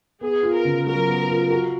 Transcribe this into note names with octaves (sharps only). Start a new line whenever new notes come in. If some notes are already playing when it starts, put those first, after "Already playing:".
B3 G#4
F4
A#4
C#3
F#3 A#4
B3
F4
F#4